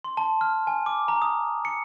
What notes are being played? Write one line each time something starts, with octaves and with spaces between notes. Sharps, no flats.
C6
A5
F6
G#5
D6
A#5
D#6
C#7